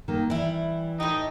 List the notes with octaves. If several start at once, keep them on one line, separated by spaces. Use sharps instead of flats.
D#3 A#3
E3 G3 E4
A2 D#4 G4